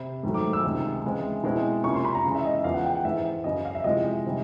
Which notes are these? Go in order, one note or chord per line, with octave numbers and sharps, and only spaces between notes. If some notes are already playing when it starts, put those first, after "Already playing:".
Already playing: C3 B5
G#2 D#3 F#3 A3
D6
E6
C#2 C3 D#3 G#3
C#3 E3 G#3 C4 E4
B2 G#3 C4 E4
C3 F3 A#3 C#4 C#6
C6
B5
A#5
C#3 E3 G#3
E5
D#5
E5
E2 C#3 F3 F5
F#5
G5
F#5
G#2 E3 G#3 E5
F#2 C#3 F#3 D#5
F5
E5
C3 F3 G#3 C4 E4 D#5
C3 D#3 G3